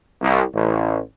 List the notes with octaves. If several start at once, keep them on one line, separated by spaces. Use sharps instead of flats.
C2
A1